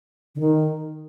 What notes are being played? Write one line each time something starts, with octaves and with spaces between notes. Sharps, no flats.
D3
D#3